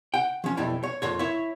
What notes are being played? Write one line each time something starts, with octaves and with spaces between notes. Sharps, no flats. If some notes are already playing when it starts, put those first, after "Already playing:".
F#5 G5
F3 C#4
B1 F2 G3 E4
C#5
F2 A#2 C#5
E4 C#5